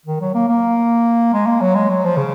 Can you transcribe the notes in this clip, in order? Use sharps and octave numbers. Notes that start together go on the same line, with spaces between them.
D#3
F#3
A#3
A#3
G#3
A#3
F#3
G#3
F#3
F3
C#3